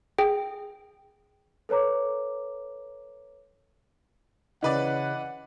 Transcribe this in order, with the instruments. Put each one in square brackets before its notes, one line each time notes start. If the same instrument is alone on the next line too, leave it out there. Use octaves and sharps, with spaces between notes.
[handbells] G#4 G5
[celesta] A4 B4 C#5 A#5 D6
[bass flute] C#3 [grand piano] E3 B4 D5 [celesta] D#5 [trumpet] F#5